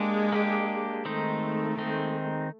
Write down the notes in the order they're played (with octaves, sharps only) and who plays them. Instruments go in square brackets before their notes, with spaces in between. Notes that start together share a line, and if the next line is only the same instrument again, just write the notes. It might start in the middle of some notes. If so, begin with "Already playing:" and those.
Already playing: [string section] G#3 [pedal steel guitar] A#3 D4 G4
[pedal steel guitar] A#3 D4 G4
[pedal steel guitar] D#3 G#3 C4 D#4 [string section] A3
[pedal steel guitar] D#3 G#3 C4 D#4